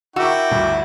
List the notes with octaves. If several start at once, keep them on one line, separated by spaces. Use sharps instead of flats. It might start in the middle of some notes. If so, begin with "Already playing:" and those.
E4 F#4 A#4 G5 C#6 D6 E6
G1 D2 G2